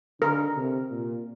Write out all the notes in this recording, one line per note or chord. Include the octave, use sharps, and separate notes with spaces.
D3 A#4
C3
A#2